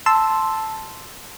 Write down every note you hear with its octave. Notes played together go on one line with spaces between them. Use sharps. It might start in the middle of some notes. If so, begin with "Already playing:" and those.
A5 C6 E6